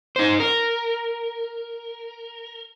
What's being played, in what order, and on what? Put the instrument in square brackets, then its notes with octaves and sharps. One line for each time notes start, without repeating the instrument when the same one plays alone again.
[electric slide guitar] D#4 C5
A#4